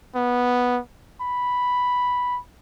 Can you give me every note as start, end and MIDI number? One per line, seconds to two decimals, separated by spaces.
0.15 0.79 59
1.21 2.39 83